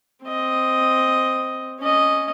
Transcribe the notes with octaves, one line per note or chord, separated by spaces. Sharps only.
C4 D#5
C#4 D#5